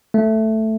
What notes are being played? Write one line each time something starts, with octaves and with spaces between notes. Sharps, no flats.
A3